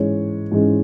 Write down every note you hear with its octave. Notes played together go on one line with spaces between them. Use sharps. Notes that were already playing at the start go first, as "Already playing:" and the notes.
Already playing: G#2 E3 G#3 C#4 C#5
G#2 E3 G#3 C#4